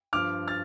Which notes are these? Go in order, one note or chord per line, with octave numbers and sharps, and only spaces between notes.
G2 F3 D6 F6
F6 A6